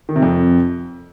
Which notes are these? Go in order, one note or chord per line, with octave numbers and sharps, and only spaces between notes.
D#3
C3
F2